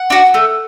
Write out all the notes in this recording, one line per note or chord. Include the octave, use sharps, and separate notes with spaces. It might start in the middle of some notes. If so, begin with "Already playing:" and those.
Already playing: F#5
D4 F#4
A3